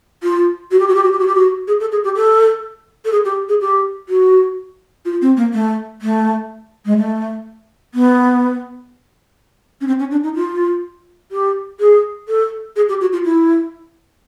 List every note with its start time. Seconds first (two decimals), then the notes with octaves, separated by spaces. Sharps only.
0.23 F4
0.71 F#4
0.80 G4
0.88 F#4
0.95 G4
1.04 F#4
1.12 G4
1.19 F#4
1.27 G4
1.35 F#4
1.67 G#4
1.80 A4
1.92 G#4
2.04 G4
2.16 A4
3.05 A4
3.12 G#4
3.25 G4
3.49 G#4
3.61 G4
4.09 F#4
5.05 F4
5.22 C4
5.37 A#3
5.53 A3
6.02 A3
6.86 G#3
6.98 A3
7.94 B3
9.81 C#4
9.87 C4
9.99 C#4
10.11 D4
10.23 D#4
10.35 F4
11.32 G4
11.80 G#4
12.28 A4
12.76 G#4
12.89 G4
13.01 F#4
13.13 F4
13.25 E4